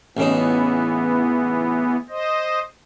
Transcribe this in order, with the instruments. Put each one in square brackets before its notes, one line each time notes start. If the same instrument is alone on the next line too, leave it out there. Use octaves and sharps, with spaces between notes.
[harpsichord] A1 C#3 D#4 [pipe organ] E3 B3
[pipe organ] C5 D#5